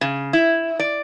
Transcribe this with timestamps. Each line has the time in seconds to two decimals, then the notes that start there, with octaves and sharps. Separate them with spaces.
0.01 C#3
0.33 E4
0.79 D5